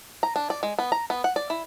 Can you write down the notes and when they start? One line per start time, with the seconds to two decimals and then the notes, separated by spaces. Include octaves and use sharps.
0.23 A#5
0.36 D4
0.50 D5
0.63 G#3
0.79 B3
0.92 A#5
1.10 B3
1.24 F#5
1.36 D5
1.50 E4